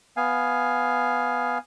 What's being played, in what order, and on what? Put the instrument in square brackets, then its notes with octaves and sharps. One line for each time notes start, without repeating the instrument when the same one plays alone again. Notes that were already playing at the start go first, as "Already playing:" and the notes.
[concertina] B3 F5 G#5